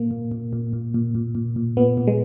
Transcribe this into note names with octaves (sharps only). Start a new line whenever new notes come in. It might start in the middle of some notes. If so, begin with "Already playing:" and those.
Already playing: A#2 A#3
A#2
A#2
A#2
A#2
A#2
A#2
A#2
A#2
A#2 B3
A#2
G#3